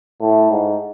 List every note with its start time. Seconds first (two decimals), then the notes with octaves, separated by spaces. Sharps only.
0.21 A2
0.51 G#2